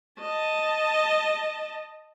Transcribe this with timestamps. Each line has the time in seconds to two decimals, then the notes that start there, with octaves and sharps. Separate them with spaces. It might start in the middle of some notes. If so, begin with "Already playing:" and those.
0.20 D#5 A5